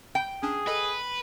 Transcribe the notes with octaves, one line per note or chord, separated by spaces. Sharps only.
G5 G6
C#4 D4 G#4
A4 B4 D#5